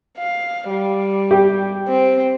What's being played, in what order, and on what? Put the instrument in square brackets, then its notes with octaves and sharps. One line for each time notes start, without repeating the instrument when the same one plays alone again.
[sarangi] F5
G3
[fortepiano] G4
[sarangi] C4